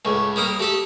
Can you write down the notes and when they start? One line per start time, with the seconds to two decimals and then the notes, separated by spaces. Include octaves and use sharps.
0.05 C#2 A2 C#6
0.36 G3 A#3 A#4 D#6
0.59 A3 G4 A4